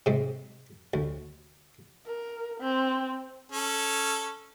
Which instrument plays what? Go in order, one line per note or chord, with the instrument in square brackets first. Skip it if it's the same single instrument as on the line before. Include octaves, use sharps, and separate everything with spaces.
[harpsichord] G#2 C3
D2
[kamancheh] A#4
C4
[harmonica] C#4 A4